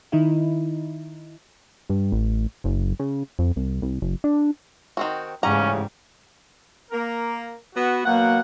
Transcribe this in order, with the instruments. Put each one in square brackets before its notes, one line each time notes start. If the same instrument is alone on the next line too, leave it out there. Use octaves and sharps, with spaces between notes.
[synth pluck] D#3 D#4 E4
[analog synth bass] G2
A1
F#1
C#3
F2
C2
C2
F#1
D4
[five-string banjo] D#3 C4 F#4
[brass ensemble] A1 C#3 [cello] G#2 [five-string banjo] G3 F#5 A#5 [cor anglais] C#4
[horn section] A#3 A#4
B3 F#4
[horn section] B2 F#3 F#5 [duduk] A#3